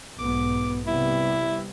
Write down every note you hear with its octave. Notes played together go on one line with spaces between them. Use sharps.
B1 G#2 B3 D6
C3 G3 B3 E4